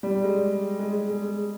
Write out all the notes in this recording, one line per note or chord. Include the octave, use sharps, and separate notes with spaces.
G3
G#3
G#3
G#3
G#3
G#3